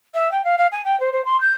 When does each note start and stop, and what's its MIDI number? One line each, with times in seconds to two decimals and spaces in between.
0.14 0.31 76
0.31 0.44 79
0.44 0.55 77
0.58 0.67 77
0.72 0.82 80
0.85 0.98 79
1.00 1.09 72
1.12 1.24 72
1.25 1.39 84
1.40 1.53 91